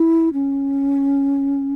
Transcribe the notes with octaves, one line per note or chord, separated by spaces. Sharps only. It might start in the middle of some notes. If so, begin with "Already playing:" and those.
Already playing: E4
C#4